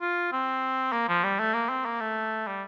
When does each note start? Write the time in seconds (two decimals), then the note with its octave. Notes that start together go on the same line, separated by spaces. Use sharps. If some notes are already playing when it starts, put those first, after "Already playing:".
0.01 F4
0.32 C4
0.92 A#3
1.08 F3
1.24 G3
1.39 A3
1.54 A#3
1.69 C4
1.85 A#3
2.00 A3
2.46 G3